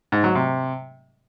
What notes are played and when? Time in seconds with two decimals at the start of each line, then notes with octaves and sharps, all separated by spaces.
0.12 G#2
0.24 F#3
0.35 C3